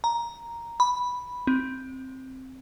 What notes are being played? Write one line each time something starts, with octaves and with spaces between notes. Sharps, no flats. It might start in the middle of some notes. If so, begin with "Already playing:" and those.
A#5
B5
C4